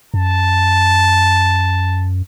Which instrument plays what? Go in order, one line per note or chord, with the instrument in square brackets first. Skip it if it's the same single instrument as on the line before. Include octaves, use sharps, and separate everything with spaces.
[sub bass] F#2 [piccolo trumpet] A5